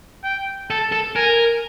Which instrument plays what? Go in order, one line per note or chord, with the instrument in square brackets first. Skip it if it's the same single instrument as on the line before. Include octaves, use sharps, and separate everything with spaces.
[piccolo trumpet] G5
[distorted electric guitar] A4 [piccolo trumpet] A5
[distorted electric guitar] A4
[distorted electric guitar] A#4 [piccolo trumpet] G#5